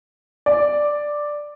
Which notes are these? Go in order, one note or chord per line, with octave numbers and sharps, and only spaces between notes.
D5